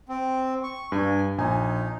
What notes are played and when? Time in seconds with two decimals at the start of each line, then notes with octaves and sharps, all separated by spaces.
0.09 C4
0.63 C#6
0.92 G2 G#5
1.38 A#1 D#4 G#5